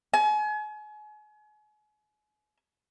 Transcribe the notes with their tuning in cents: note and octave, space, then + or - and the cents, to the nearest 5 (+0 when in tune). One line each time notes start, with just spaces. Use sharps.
G#5 +35